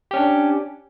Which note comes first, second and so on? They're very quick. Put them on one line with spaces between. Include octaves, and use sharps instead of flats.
G4 C#4 D4